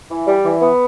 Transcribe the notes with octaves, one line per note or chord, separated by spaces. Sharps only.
E3
G3
E3
B3